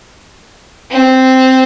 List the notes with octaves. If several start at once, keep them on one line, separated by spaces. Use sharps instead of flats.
C4